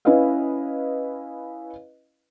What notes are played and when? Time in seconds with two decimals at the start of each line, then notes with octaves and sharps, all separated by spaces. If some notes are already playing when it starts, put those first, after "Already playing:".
0.05 C#4 E4 B4 C#5 D#5 F5